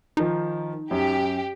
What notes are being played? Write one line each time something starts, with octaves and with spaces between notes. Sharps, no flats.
D#3 F3 D#4
F#2 G4